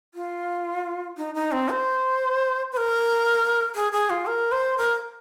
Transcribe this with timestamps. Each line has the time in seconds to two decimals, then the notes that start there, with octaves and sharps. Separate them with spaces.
0.14 F4
1.17 D#4
1.35 D#4
1.52 C4
1.70 C5
2.72 C5
2.77 A#4
3.75 G#4
3.92 G#4
4.10 F4
4.26 A#4
4.52 C5
4.78 A#4